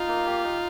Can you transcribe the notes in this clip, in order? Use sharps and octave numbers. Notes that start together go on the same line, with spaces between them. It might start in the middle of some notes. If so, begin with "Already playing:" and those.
Already playing: D#4 F4
A#3
G4
D#4